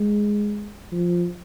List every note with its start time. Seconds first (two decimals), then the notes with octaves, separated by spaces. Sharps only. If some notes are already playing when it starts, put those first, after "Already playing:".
Already playing: G#3
0.92 F3